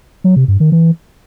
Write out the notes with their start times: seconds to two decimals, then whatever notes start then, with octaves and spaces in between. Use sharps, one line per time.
0.24 F#3
0.36 C3
0.48 G2
0.60 D#3
0.72 E3